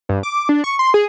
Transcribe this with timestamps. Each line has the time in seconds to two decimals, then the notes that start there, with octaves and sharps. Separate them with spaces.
0.09 G2
0.23 D6
0.49 D4
0.64 C#6
0.79 C6
0.94 G#4